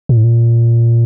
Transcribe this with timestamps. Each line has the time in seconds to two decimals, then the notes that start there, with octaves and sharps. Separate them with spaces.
0.09 A#2
0.17 A2
0.24 A#2